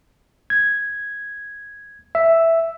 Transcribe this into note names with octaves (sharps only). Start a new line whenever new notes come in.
G#6
E5